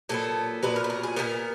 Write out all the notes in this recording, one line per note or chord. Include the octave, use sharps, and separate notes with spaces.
A#2 F#3 B3 A4
A#2 F#3 B3 B4
A#4
B4
A#4
G#4
A#2 F#3 B3 A#4